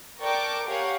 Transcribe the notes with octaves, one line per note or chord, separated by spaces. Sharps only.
A#4 D5 G5 A5 C#6 D6
G4 A#4 C#5 F5 F#5 G#5